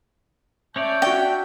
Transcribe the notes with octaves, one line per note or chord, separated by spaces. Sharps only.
C#4 C#5 D5 E5 A5 G6
D4 F#4 G5